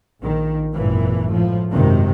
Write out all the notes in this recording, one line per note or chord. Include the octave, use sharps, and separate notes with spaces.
A#1 D#3
G#1 F#2 A#2 E3
A2 F3
G#1 F#2 C3 D#3